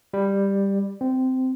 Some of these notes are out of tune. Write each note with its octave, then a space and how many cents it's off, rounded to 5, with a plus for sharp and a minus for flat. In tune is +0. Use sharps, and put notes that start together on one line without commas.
G3 +10
C4 -15